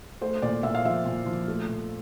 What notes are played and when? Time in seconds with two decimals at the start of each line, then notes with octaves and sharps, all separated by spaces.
0.21 A3 C5
0.42 A#2 D5
0.63 A#2 E5
0.74 F5
0.84 F3 E5
1.05 A#2
1.26 F3
1.48 A3
1.68 A#2